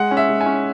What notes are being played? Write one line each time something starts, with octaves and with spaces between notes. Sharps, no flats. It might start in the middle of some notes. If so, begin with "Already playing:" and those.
Already playing: G#3 F#5
C#4
E5
G#3
G#5
C#4